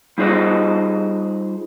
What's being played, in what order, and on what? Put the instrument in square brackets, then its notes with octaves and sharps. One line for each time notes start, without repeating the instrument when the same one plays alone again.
[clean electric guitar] G3 D#4 F4 G#4 C5 D#5